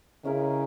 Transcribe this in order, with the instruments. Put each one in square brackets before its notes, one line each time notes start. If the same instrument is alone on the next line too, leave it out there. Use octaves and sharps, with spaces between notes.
[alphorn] C#3 [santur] G#3 C#4 E4 A#4